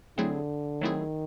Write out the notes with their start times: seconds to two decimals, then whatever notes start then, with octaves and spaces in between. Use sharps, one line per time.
0.18 D3 F#3 A3 C4 E4 G#4
0.81 D#3 F#3 A3 C4 E4 G#4